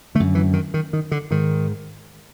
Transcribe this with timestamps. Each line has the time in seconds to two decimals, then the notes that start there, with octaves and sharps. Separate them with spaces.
0.15 D3 A3
0.20 F#2
0.35 E3
0.53 D#3
0.74 D#3
0.93 D#3
1.11 D3
1.31 G#2 D#3